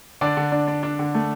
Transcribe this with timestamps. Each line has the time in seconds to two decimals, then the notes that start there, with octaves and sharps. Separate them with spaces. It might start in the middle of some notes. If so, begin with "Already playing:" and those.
0.21 D3 D4 D5
0.37 D3
0.52 D4
0.68 D4
0.83 D4
0.99 D3
1.14 A3